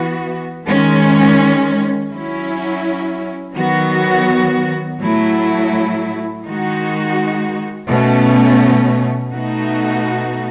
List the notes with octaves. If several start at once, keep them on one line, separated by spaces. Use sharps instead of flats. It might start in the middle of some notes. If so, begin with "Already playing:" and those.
Already playing: E3 B3 F#4
D#3 G#3 C#4
F#3 C#4 E4
D#3 F#3 B3 F#4
A2 F#3 A3 E4
D#3 G#3 D#4 F#4
B2 A3 C#4
B2 A3 D#4 F#4